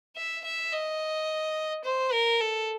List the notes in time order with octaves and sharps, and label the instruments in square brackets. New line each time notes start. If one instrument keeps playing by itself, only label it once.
[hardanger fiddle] E5
E5
D#5
C5
A#4
A4